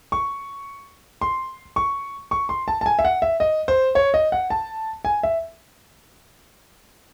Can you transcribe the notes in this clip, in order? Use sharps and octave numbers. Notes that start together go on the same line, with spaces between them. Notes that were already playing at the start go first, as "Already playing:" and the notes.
C#6
C6
C#6
C#6
C6
A5
A5
G#5
E5
F#5
E5
D#5
C5
C#5
D#5
F#5
A5
G#5
E5